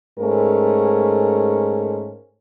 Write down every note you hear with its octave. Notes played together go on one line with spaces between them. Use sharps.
G#2 A3 C#4 A#4